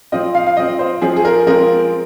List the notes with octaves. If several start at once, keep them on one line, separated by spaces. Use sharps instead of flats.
F3 C4 F4 D#5
F5
F5
F3 C4 F4 D#5
C5
F3 C4 F4 G#4
G#4
A#4
F3 G#3 C4 F4 A#4